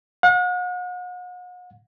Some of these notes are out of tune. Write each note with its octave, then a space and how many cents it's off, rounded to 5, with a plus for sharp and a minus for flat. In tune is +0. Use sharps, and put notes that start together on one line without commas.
F#5 -40